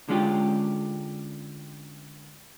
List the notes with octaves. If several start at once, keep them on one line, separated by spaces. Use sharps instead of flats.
D3 G#3 C#4 F4 G4